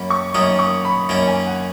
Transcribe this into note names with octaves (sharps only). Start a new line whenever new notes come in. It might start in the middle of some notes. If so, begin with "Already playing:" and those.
Already playing: F#2 A#3 C#4 B5
C#6
F#2 D#3 A#3 C#4 D#6
C#6
B5
F#2 D#3 A#3 C#4
G#5
F#5